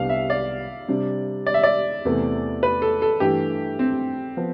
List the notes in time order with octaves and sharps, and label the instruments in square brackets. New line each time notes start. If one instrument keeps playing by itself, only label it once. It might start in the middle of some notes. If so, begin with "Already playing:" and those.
Already playing: [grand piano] C2 C3 G3 B3 D4 [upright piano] F5
[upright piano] E5
D5
[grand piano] C3 G3 D4
[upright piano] D5
E5
D5
[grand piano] E2 C3 E3 A3
[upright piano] B4
A4
A4
[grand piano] G2 E3 A3 [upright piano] G4
[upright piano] C4
[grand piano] F3 B3